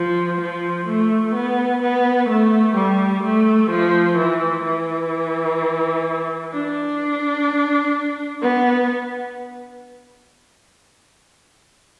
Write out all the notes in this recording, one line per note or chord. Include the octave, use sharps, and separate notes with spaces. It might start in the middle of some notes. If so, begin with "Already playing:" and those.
Already playing: F3
F3
A3
B3
B3
A3
G3
A3
F3
E3
E3
D4
B3